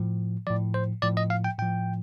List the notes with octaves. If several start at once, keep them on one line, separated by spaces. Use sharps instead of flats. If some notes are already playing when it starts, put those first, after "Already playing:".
Already playing: A2 F3
A2 F3 D5
C5
A2 F3 D5
D#5
F5
G5
A2 F3 G5